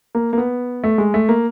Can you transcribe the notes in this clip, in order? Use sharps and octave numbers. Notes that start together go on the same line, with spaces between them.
A#3
A#3
B3
A3
G#3
A3
A#3